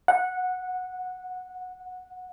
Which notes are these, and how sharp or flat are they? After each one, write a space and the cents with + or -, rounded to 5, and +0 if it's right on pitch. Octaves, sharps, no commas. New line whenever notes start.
F#5 -20